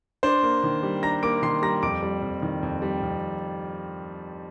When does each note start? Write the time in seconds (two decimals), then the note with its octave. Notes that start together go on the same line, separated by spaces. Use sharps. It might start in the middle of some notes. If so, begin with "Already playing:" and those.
0.23 D4 C5 C6
0.43 A#3
0.63 D#3
0.83 G3
1.03 D4 A#5 A#6
1.23 A#3 D6 D7
1.42 D#3 C6 C7
1.62 G3 A#5 A#6
1.82 F2 D6 D7
2.03 G3
2.22 F2
2.42 D#3
2.63 F2
2.82 G3
3.02 F2